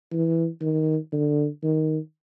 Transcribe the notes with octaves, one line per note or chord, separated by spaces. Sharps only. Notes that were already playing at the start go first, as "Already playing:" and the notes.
E3
D#3
D3
D#3